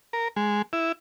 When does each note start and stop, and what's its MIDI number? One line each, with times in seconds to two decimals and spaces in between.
0.13 0.28 70
0.36 0.62 56
0.73 0.92 64